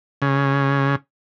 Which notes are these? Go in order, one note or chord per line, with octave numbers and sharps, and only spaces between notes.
C#3